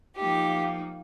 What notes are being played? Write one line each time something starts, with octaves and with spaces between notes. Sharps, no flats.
F3 A#3 D#4 G4